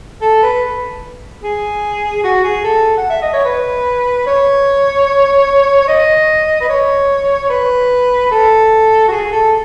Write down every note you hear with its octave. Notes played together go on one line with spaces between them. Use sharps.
A4
B4
G#4
F#4
G#4
A4
F#5
E5
D#5
C#5
B4
C#5
D#5
B4
C#5
B4
A4
F#4
G#4
A4